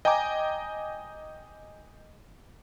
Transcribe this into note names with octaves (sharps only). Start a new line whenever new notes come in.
D#5 G5 G#5 A#5 D6 D#6